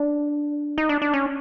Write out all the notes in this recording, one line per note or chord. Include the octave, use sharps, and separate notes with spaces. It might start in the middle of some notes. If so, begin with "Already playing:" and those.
Already playing: D4
D#4
D4
D4
C#4